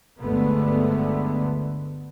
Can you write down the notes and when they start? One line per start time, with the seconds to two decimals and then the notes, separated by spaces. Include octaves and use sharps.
0.19 G1 D2 D3 G#3 A3 B3